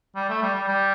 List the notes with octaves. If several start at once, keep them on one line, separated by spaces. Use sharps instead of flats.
G3
A3
G3
G3
G3